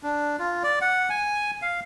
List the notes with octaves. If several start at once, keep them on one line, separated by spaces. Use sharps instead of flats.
D4
F4
D5
F#5
G#5
F5